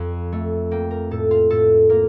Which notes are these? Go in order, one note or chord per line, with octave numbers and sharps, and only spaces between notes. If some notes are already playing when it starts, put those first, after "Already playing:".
Already playing: F2
A3
A#3 G5
A#4
A2 A4
F4
A2 A4
A#3 A#4